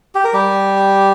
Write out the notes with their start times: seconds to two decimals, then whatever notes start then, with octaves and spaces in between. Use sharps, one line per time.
0.15 G4
0.24 A#4
0.33 G3 G4